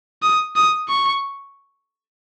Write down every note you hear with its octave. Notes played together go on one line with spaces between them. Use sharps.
D#6
D#6
C#6